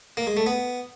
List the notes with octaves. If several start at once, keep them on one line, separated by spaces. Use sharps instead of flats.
A#3
G#3
A3
B3